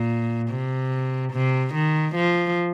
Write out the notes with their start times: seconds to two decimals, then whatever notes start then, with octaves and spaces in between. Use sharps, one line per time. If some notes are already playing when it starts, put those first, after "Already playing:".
Already playing: A#2
0.50 C3
1.33 C3
1.74 D#3
2.15 F3